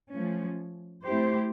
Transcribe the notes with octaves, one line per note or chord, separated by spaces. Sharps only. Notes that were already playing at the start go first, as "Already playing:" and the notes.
F3 A3 C#4
A3 C4 E4 G4 C5